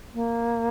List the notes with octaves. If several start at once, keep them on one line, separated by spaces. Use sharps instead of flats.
A#3